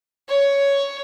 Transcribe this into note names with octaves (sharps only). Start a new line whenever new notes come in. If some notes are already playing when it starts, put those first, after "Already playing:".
C#5